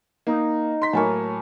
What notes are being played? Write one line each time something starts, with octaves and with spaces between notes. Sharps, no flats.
A#3 D#4
C6 B6
A2 F#3 A#3 G#5 A5 C#6